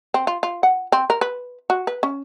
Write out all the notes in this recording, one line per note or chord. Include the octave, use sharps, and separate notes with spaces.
C4
F4
F4
F#5
C4
A#4
B4
F#4
B4
C#4